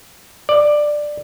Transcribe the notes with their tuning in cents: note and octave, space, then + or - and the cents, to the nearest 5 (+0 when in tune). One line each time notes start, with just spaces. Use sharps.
D5 +10